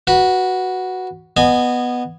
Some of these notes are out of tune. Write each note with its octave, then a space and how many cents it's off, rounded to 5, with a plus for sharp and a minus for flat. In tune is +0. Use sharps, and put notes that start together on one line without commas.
F#4 +0 B4 -15
B3 +0 D#5 -25 G#5 +0